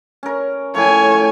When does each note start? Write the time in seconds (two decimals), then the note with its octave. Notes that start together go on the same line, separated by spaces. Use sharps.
0.23 C#4 A#4
0.74 A2 F3 C#5 G#5